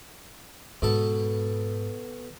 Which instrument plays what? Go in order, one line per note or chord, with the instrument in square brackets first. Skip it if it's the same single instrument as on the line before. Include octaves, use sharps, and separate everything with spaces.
[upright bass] G#2 [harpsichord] B2 A4 A5